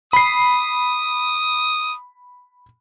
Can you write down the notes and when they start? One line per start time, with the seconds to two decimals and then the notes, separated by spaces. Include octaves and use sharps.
0.13 B5 D#6 C7